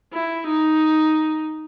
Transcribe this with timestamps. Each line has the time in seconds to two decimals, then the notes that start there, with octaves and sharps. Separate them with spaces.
0.13 E4
0.47 D#4